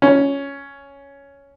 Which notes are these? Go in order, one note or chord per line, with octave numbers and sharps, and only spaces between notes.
C#4